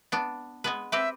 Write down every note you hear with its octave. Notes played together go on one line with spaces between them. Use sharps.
B3 D4
G#3 B3 B4
C4 G4 B4 E5